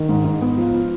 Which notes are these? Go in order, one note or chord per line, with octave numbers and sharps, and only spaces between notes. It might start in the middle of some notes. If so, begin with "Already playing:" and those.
Already playing: D#3
G#2
G#2
B3
F3
F4